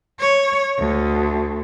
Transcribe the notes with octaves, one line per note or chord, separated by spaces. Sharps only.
C#5
D2